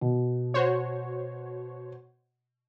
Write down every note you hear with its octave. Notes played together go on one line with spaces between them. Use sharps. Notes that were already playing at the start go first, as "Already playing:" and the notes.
B2
F#4 C5 C#5